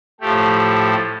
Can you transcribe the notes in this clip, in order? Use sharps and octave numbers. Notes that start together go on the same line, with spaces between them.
A2 F3 A3 G4